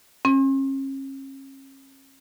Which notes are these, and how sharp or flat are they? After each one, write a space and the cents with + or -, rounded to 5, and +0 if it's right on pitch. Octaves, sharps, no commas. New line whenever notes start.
C#4 -40